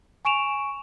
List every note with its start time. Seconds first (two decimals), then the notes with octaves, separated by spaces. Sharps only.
0.25 G#5 C#6 D7 E7 F7